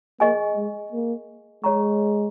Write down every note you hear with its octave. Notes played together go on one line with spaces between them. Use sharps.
A#3 G#4 D#5 G#5 C#6
G#3
A#3
G#3 G#4 C#5 A#5 C#6